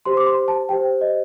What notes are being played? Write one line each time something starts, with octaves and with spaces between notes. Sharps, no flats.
G4 C5 C6
D6
C6
A5
G4 C5 G5
D#5